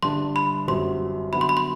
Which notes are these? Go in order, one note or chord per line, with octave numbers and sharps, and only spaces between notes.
G1 G2 D3 G3 D4 C6
B5
G1 F#2 F#3 C4 G4 C6
D3 F#3 B3 E4 B5
C6
B5
C6